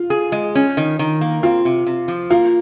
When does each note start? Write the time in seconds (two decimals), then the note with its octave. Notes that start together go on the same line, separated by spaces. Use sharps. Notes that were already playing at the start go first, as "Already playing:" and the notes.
Already playing: F4
0.10 G#4
0.32 G#3
0.55 C#4
0.77 D#3
0.99 D#3
1.21 A#3
1.43 C4 F4
1.65 C3
1.86 C3
2.08 F3
2.30 A#3 F4